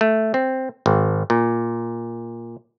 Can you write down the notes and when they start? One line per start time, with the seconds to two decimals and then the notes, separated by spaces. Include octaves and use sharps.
0.01 A3
0.34 C4
0.86 G#1
1.30 A#2